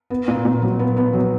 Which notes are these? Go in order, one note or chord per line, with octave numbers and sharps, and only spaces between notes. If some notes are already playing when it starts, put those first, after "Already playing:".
B3
A#2
A#2
F#3
B3
B3
F#3